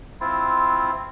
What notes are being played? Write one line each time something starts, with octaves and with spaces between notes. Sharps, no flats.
C4 E4 F4